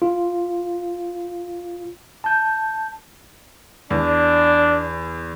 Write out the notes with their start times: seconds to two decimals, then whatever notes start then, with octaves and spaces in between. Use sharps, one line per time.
0.02 F4
2.24 A5 G6
3.90 E2 D4